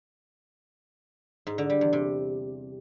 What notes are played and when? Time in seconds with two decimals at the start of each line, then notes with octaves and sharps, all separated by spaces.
1.47 G#2
1.58 D3
1.70 G3
1.81 E2
1.93 C3